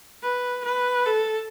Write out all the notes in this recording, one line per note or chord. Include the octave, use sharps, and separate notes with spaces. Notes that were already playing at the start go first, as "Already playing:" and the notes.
B4
B4
A4